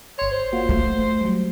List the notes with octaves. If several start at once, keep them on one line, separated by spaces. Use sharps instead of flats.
G1 C#5 C6
C5
A#3 F4 F#4
A3
F#3 G3